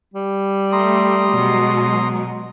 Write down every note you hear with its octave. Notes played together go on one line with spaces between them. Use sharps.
G3
A3 A#5 C6 D#6
B2 F#3 G#3